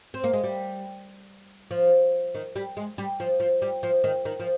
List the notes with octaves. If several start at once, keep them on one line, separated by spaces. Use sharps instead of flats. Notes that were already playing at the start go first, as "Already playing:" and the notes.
C4
A#3
G#3
G3
F3
D#3
G3
G#3
G3
F3
F3
G3
F3
D#3
D#3
F3